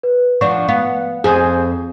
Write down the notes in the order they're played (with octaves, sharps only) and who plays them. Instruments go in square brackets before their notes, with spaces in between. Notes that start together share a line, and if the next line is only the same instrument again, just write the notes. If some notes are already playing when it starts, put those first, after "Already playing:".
[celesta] B4
[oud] F3 D4 [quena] F#5 [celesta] C#6
[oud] B3 [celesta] F5
[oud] F2 [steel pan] G#4 [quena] C5